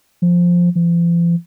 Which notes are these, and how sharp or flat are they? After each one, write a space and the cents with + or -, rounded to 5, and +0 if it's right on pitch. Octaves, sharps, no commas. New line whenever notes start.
F3 +5
F3 -45